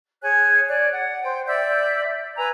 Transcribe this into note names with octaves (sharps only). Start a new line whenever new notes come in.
G#4 C#5 G#5 F#6
C#5 D5 F#6
F#5
C5 G5
D5 E5 E6 G6
B4 G#5 A#5 E6